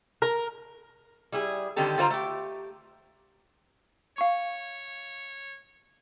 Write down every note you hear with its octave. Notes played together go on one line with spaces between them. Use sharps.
A#4
G3 E4 G#4
D3 D#3 G3 C4 G4 A4
D3 G3 F4 C5 D#5 A#5
A3 G4
C#5 F5 C#6